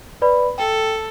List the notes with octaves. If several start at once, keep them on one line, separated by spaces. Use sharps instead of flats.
B4 D5 B5
A4 G5